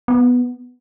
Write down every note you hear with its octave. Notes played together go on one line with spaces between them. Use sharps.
B3